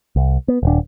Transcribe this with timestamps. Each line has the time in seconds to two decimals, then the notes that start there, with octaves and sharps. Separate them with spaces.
0.16 C2
0.48 B3
0.63 D#1 D4